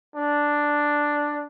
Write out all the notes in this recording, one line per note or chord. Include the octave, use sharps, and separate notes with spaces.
D4